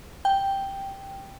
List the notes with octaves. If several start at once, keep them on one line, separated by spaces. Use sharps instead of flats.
G5